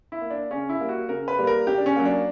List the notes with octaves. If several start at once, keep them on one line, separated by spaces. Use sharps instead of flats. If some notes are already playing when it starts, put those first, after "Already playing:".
E4
A#3
D4
C#3 C#4
E4
G3 A#3
F#4
C#3 A#4
B4
G3 A#3
A#4
C#3 G4
D4
C#4
F#3 A#3
D4